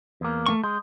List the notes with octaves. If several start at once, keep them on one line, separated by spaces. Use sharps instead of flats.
E2 A#3
A3 C4 C#6
G#3 G6